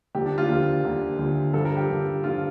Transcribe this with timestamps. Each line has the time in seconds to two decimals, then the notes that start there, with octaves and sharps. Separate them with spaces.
0.15 D2 D3 F3 A#3 G4
0.26 D4
0.38 F4
0.49 D2 D3 F3 A#3 G4
0.83 D2 D3 F3 A#3
1.19 D2 D3 F3 A#3
1.54 G2 D3 F3 A4
1.65 A#4
1.77 G4
1.88 G2 D3 F3
2.23 G2 D3 F3 F4